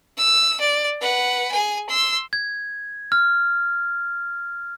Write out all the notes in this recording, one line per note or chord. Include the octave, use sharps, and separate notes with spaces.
E6
D5
B4 F#5
G#4 G#5
C6 E6
G#6
F6